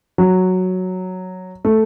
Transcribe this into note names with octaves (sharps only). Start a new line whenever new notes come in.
F#3
A3